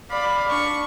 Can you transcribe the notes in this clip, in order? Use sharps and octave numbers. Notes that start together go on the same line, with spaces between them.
D5 F5 B5
D4 C#6